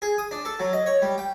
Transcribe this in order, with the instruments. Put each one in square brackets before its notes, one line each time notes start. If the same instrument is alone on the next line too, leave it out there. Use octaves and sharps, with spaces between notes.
[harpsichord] G#4
D#6
D4
A4
F#3
D#5
C#5
G3
G5